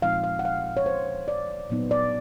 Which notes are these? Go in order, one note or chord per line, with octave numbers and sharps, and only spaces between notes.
A#2 F3 G#3 C4 D#4 F5
F5
F#5
F5
C#5
C5
D5
A#2 F#3 B3 D#4
D5